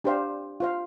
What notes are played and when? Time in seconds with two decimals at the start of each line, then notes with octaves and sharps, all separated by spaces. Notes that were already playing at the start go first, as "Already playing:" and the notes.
0.04 D4 G4 C5 F5
0.60 F4 C5 F5